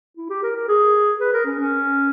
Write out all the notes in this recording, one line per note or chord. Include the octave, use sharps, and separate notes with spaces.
E4
G4
A#4
A#4
G#4
B4
A#4
C#4
C#4